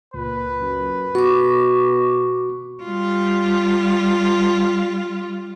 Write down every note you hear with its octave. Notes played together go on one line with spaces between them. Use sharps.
C#2 A#2 B4
F#2
B2 F#4 C#6 D6
G3 F4